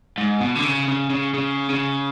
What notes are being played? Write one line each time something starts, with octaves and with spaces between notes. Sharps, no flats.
G#2
B2
D3
C#3
C#3
C#3
C#3
C#3